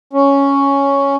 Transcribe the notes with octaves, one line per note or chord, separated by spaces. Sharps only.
C#4